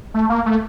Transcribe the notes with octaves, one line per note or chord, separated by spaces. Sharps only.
A3
A#3
A3